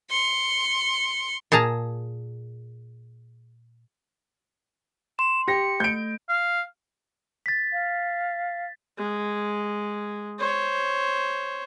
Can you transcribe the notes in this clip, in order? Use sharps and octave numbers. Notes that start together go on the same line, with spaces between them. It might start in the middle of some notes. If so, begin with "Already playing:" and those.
C6 C#7
A#2 G#4 A5 A#5
C6 E7
G4 A#6 C#7
A3 G6 D7
F5
A6 B6
F5
G#3
C5 C#5